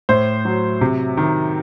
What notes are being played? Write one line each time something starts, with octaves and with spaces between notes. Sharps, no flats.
A2 C5
F#3
C3
D#3